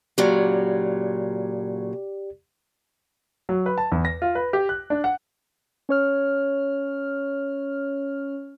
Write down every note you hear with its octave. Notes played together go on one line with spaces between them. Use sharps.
A#2 C#3 F#3 G4 D5
F#3
B4
A5
E2
A#6
F4
B4
G4
F#6
D4
F#5
C#4 C#5 F6